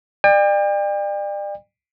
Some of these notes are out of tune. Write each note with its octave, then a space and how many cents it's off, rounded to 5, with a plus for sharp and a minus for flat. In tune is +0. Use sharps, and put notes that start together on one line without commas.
D5 +35 G5 +40